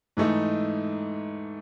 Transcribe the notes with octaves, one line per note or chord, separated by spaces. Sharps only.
G#2 E3 A3 D#4